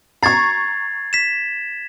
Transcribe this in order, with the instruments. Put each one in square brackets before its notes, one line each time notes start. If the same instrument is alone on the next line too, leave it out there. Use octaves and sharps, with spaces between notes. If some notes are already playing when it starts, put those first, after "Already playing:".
[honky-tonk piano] A#5 C#6 [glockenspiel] G#6 A6 C7
[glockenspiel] B6 E7